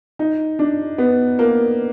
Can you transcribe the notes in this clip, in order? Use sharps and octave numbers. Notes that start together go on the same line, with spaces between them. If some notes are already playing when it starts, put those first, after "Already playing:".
D#4
D4
B3
A#3